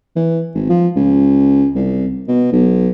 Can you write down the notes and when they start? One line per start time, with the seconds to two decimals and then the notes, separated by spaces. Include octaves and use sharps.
0.16 E3
0.55 G#1
0.69 F3
0.96 C#2
1.75 C2
2.28 B2
2.52 B1